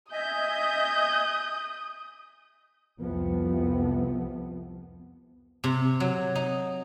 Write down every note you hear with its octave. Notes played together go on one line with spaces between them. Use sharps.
D#5 E5 G#5 D#6 G6
C2 F2 C3 F3 B3
C3
F#3
D#4